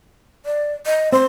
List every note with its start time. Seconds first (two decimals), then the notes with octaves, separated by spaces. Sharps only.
0.45 D5
0.86 D#5
1.12 C4 C6